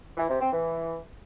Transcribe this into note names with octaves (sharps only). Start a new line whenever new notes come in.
E3
C3
C4
E3